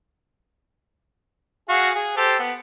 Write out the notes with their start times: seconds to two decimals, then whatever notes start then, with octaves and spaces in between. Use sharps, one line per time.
1.69 F#4 G#4 F5
1.95 G#4
2.17 G4 A4 C5
2.39 B3